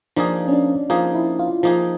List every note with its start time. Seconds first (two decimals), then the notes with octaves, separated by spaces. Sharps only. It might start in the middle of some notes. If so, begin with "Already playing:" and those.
0.17 F3 A#3 D4 D#4 G#4
0.48 C#4
0.53 D4
0.90 F3 A#3 D#4 F4 G#4
1.15 E4
1.39 F4
1.63 F3 A#3 D#4 F4 G#4